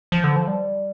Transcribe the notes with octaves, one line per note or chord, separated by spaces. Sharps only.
F3
D3
F3
G3